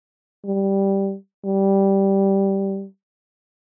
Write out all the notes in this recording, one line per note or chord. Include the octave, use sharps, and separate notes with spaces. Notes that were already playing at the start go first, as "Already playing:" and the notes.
G3
G3